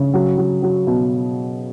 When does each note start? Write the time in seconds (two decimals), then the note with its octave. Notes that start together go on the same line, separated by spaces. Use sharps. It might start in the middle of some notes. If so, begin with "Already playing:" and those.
Already playing: C#3
0.13 F#3
0.38 F#3
0.63 F#3
0.87 B2